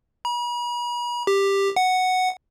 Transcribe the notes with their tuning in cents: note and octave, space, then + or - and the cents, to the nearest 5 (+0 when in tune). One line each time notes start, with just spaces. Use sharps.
B5 -45
G4 +10
F#5 +0